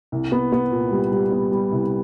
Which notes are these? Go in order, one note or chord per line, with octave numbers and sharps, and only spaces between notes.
C2
B3
B3
A#2
G3
G3
B3
G3
C2